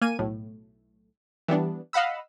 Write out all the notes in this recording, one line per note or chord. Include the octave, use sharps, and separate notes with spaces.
A#3 G#5 D#7
B1 A2
E3 G3 B3 D4
D#5 F5 F#5 B5 E6